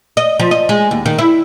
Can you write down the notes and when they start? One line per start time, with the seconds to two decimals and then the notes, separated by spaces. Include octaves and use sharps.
0.17 D#5
0.40 F3
0.51 D#5
0.69 G#3
0.91 D#2
1.06 D#3
1.19 E4